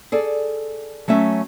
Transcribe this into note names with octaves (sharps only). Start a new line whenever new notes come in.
G#4 A4 D5
F#3 A3 C#4 E5